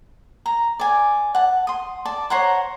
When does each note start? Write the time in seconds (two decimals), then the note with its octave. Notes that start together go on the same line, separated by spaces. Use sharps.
0.46 A#5
0.79 D5 G#5
1.35 F#5 A5
1.67 C6 D#6
2.05 D5 A5
2.30 C5 C#5 F#5 A#5